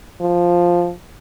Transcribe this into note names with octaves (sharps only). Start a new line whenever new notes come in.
F3